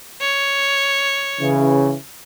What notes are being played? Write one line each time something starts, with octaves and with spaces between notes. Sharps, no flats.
C#5
C#3 E3